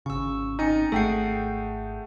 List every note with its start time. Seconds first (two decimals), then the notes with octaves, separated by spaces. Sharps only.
0.06 G#1 C#3 C#6 E6
0.59 C4 D#4 G#5 C#7
0.92 G#1 A3 G#4 F#5 G5 C7